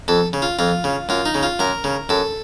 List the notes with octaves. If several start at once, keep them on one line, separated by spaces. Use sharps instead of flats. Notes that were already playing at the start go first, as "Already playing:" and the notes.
F2 A4
C#3
F4
F2 F4
C#3
F#2 F4
D#4
C#3
F4
F#2 A#4
C#3
F#2 A4